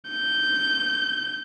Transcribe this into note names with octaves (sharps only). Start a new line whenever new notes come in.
G6